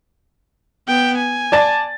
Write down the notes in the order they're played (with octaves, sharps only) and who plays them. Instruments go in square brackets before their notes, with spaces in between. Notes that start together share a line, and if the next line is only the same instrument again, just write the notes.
[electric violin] B3 G5
G#5
[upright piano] D5 A5 A6